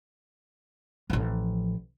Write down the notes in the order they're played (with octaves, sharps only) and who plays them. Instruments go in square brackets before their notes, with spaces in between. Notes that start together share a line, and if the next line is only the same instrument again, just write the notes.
[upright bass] A1 F3